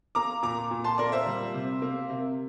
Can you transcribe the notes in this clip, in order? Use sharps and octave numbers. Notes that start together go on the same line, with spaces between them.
A#3 A#5 D6
A#2 A#5 D6
A#2
A5 C6
A#3 A#4 D5
C5 E5
G3
C3
A#3
C3